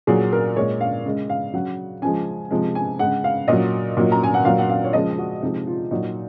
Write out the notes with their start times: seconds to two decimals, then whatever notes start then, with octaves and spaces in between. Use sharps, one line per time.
0.07 A#2 F#3 G#4
0.33 A#4
0.56 A#2 G#3 C#5
0.81 F5
1.05 C#3 G#3
1.30 F5
1.53 C#3 F#3 F#5
2.02 C#3 F3 G#3 G#5
2.51 C3 F3 G#3
2.75 G#5
2.99 C#3 G#3 F#5
3.24 F5
3.48 A#2 F#3 D#5
3.97 A#2 F#3
4.12 A#5
4.23 G#5
4.34 F#5
4.45 A#2 F#3 F5
4.58 F#5
4.69 F5
4.84 C#5
4.93 C#3 F3 G#3 D#5
5.18 F#4
5.42 C3 F3 G#3 D#4
5.67 F4
5.91 A#2 F#3 D#4